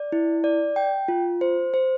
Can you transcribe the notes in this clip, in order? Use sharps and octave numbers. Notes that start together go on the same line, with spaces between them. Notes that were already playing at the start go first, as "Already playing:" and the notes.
Already playing: D5
E4
D5
G5
F4
C5
C5